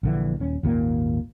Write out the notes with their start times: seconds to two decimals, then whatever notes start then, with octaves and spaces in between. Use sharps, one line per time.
0.03 A#1 D3 E3
0.40 D#1 C#4
0.63 G#1 D#2 A#2 A#3